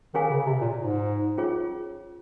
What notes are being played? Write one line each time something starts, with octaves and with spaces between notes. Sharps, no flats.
D#3 C#4 G#4 C#5 F5 G#5
C#3
C3
A#2
G#2
C#4 F4 G#4 C#5